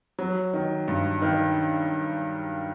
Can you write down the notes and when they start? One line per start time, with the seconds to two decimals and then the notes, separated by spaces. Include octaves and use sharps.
0.19 F#3
0.53 D#3
0.88 G2
1.22 D#3